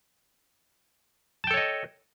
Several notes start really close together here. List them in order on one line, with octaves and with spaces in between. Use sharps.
A5 G5 A4 C#5 D#5